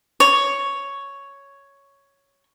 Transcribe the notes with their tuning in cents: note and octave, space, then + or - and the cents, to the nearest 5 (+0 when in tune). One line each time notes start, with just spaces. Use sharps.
C#5 +5